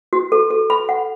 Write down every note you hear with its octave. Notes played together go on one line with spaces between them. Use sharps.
F#4
A4
A4
B5
F#5